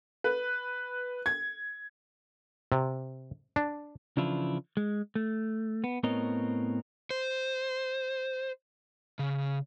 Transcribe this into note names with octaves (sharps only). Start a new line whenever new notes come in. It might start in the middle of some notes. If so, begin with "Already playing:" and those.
B4
G#6
C3
D4
C#3 E3 F3 D4 E4 F4
G#3
A3
B3
A2 B3 C4 A#4 C#5 D#5
C5
C#3